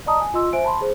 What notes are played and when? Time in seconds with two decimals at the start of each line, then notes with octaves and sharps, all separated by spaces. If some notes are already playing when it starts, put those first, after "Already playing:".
0.06 D5 D#5 A5 A#5 D#6
0.21 G#5
0.34 F4 D#5 C6 E6
0.53 C5 E5 G#5 D7
0.65 A5 B5 C6
0.81 G#4 C5